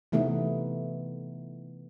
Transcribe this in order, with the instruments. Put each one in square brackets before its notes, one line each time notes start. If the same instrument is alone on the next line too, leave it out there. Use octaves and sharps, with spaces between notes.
[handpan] C3 E3 A3 B3 D#4